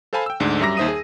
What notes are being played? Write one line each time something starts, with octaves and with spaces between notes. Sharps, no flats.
A4 C5 F5 G#5 A5 B5
G5 E6
D2 G#2 D4
F#2 G3 E5 A#5 D6 A#6
D#2 D#4 C5 E5 D#6 D#7
G#4